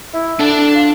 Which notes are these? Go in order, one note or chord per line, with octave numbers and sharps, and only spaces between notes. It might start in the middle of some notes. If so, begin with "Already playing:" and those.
E4
D3 D4 A5
F4